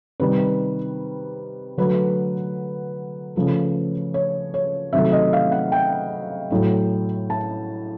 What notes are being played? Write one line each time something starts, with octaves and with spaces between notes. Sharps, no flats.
C3 D#3 G3 B4
D3 F#3 A3 B4
C#3 F3 A3
C#5
C#5
C3 D#3 F#3 A3 E5
D#5
F5
F#5
G5
A2 F#3 A3
A5